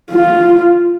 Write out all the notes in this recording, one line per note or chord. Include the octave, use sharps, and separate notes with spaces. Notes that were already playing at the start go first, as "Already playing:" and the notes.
F4